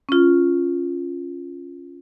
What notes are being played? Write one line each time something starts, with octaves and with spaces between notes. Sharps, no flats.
C#4 F4